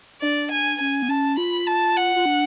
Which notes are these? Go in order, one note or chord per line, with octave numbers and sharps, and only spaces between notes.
D4 D5
G#5
C#4 G#5
B3
C#4 A5
F4 B5
A5
F#5
F4
D4